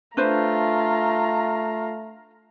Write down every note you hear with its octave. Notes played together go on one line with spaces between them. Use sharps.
A3 D4 F4 B4 C5 A#5